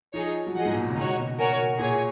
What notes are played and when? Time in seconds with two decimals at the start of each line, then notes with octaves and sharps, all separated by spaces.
0.14 F3 D#4 G#4 C#5
0.47 F#3
0.55 F3 G#4 D#5 F#5
0.65 G#2
0.73 A#2
0.81 B2
0.89 C#3
0.96 D#3 D#4 F#4 C#5
1.17 B2
1.38 F#4 A#4 C#5 G#5
1.79 A#2 G#4 C#5 G#5